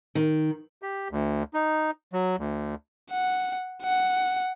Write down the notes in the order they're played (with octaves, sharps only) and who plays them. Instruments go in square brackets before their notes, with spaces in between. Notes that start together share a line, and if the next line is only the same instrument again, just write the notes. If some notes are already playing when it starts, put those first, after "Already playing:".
[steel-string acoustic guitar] D#3
[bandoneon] G4
D2
D#4
F#3
D2
[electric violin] F#5
F#5